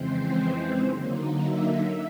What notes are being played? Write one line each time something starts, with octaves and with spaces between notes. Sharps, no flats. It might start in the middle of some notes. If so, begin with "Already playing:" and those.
Already playing: F2 C#3 E3 G#3 C4 C5
D3 F#3 A#3 D#4
E5